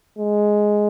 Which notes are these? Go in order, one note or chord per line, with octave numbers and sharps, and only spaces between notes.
G#3